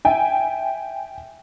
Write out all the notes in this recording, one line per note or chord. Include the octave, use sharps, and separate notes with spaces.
E5 G5 G#5